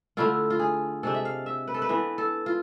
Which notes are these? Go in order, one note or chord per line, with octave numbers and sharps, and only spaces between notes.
D3 A3 E4 F4
F4
G#4
C3 G#3 D4 A4
E5
F5
E5
B4
A4
B4
E3 B3 D4
A4
F4